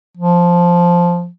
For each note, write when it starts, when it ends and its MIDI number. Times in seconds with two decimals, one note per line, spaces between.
0.17 1.28 53